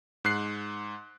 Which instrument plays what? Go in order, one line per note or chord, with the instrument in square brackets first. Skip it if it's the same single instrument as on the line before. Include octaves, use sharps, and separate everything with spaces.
[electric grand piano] G#2 F#6 C7